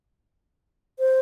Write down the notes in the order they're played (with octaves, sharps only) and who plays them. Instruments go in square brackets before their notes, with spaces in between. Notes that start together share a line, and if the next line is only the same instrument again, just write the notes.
[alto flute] C5